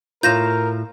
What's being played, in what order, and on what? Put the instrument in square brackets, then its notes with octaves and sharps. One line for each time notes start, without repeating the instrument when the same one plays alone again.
[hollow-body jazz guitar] A2 F4 [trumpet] A#4 [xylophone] G6 A#6 E7